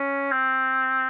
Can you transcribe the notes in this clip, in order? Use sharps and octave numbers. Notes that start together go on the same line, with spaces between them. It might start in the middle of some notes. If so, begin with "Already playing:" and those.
Already playing: C#4
C4